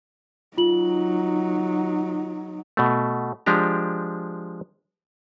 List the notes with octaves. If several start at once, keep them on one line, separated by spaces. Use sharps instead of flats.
F#3 D#4 F4 F#7
B2 A3
F3 G#3 D4 G4 A#5